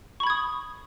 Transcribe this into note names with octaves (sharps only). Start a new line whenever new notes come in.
B5 C#6 D#6 G#6